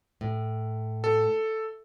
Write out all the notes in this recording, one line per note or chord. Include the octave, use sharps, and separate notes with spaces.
A2
A4